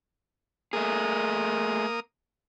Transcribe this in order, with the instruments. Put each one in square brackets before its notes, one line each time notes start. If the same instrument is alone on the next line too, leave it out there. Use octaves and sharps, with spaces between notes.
[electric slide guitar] A3 G#4 [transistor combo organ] A#3 D#6